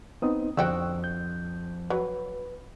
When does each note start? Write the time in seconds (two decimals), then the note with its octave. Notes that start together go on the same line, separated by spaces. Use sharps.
0.22 B3 C4 D#4 D#6
0.57 F2 D3 F#4 C5 G5 C#6 E6 F#6
1.04 G6
1.90 F#3 B4